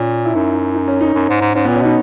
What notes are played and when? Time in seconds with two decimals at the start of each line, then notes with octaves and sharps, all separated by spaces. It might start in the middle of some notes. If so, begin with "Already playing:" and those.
Already playing: A#2 C#4
0.25 E4
0.34 F#2 D#4
0.55 E4
0.75 D#4
0.88 C#4
1.01 D#4
1.14 F#2
1.29 G#2
1.41 G#2
1.54 G#2 C#4
1.65 B3
1.68 A#2
1.75 C#4
1.81 B2 D#4